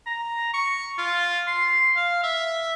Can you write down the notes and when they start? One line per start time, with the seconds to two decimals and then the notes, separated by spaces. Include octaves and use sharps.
0.07 A#5
0.54 C#6
0.98 F4
1.47 C6
1.96 F5
2.24 E5